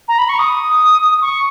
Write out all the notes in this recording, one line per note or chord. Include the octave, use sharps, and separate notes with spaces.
A#5
B5
C#6
D#6
C#6